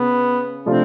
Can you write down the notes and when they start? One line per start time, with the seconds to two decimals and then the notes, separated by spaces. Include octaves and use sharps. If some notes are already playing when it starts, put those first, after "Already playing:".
Already playing: C#3 B3
0.66 C3 F3 A3 C4 D4 F4